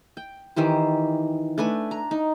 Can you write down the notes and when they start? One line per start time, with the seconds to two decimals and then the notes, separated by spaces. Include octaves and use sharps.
0.17 G5
0.56 D#3 E3 G4 C5
1.58 A3 D4 B4 G#5
1.91 A#5
2.11 D#4